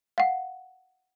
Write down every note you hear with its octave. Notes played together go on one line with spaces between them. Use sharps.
F5 F#5